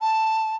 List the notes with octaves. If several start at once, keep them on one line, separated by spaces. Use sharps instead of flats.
A5